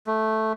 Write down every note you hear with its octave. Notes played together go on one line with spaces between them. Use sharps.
A3